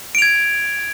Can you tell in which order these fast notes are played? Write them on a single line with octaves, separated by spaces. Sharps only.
D7 F7 G#6